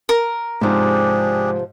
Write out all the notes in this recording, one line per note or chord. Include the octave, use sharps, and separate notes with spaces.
A#4
G#2 C3 F3 D4 G4 G#4